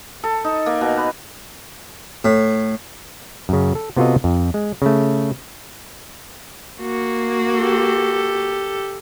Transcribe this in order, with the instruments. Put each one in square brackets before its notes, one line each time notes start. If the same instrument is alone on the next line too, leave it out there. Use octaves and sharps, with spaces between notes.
[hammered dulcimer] A4
D#4
A#3
B2
B4
[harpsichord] A2
[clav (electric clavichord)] F#2 C#3
A4
C3 B3 F4 F#4 A4 D#5
F2
G#3
C#3 A3
[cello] A#3 F#4
[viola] G4 A4